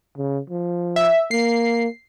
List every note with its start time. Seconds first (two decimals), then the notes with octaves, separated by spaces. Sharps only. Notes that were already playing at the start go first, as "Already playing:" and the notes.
0.17 C#3
0.50 F3
0.96 E5
1.31 A#3 C7